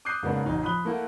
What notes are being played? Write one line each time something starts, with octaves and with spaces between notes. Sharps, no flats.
D6 D#6 F#6 G6 C7 D#7
G#2 C#3 A#3 B3 C#4 D4
A1 F#3 D#4
F3 B5 D#6 F#6 G7
A3 A#3 E4 F#5